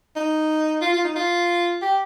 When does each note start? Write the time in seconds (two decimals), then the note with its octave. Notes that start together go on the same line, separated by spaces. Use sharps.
0.16 D#4
0.82 F4
0.93 F4
1.04 D#4
1.15 F4
1.82 G4